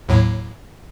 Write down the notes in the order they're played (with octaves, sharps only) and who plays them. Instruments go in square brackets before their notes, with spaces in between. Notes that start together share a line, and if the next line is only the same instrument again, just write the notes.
[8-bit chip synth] D#2 A2 F#3